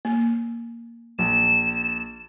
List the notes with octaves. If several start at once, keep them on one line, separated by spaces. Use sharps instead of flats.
A#3
A#1 E7